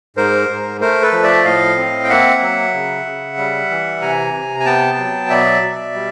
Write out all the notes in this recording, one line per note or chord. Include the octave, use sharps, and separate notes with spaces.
G#2 A#4 C5
G#2
A3 A#4 C5
A4 B4
F3
D5 E5
A2 D#5 F5
C4
G5
A#3 E5 F#5
F#3
C#3
C#3
G3
E3
C3 G#5 A#5
C3
G#5
B3 G5 A5
F#3
B2 D5 E5
B2
G3